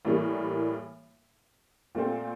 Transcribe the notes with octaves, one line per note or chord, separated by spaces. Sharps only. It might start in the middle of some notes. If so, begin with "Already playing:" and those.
A2 E3 G3 A#3
A#2 A3 C4